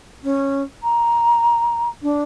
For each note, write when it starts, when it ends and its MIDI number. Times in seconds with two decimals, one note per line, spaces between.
0.23 0.62 61
0.83 1.89 82
2.02 2.22 62